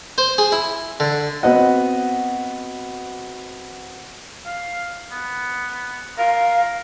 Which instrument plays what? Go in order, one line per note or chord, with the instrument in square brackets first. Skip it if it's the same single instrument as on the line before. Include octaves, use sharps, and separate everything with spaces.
[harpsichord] C5
G#4
E4
D3
[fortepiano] B3 C4 F#4 D#5 F#5
[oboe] F5
B3
[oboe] A#4 [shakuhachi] F5